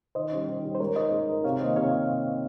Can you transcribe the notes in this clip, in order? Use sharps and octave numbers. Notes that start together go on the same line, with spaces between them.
D#3 C5 D#5
G3 C#4
D#3
G3 C#4
C5
G#3 A#4 C#5
D#4 A#4 C5 D#5
G#3
D#4 A#4
C3 C#5 F5
D#3 A#3 C5 D#5
C3 C#5 F5